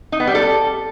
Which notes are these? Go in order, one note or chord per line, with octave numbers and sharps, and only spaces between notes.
D#4
B3
G3
A4